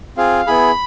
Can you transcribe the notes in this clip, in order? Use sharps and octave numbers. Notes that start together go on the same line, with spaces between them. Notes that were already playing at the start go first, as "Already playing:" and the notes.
C4 F4 G#4 F5
B3 E4 G#4 B5